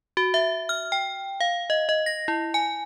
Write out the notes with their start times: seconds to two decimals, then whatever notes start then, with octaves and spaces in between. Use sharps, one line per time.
0.17 F#4
0.34 E5
0.69 F6
0.92 G5
1.40 F5
1.70 D#5
1.89 D#5
2.06 A#6
2.28 E4
2.54 G#5